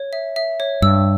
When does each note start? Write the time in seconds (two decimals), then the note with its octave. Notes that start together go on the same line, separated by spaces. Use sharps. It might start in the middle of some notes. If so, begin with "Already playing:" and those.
Already playing: C#5
0.13 E5
0.36 E5
0.60 C#5
0.82 G2 E6